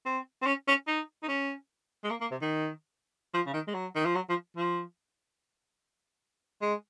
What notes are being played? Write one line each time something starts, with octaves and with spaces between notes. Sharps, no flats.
C4
C4
C#4
C#4
D#4
D#4
C#4
G#3
A#3
A#3
C3
D#3
F3
C#3
D#3
G#3
F#3
D#3
F3
F#3
F3
F3
G#3